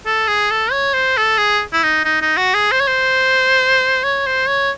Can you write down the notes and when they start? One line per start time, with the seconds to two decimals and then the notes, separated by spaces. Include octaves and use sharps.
0.06 A4
0.28 G#4
0.51 A4
0.72 C#5
0.94 C5
1.17 A4
1.38 G#4
1.73 E4
1.83 D#4
2.05 D#4
2.21 D#4
2.37 F#4
2.54 G#4
2.72 C5
2.80 C#5
2.88 C5
4.04 C#5
4.27 C5
4.48 C#5